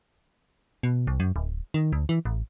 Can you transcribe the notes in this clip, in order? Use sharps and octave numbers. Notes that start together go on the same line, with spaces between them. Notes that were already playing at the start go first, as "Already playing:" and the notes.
B2
C2
F#2
D1
D#3
D2
E3
A1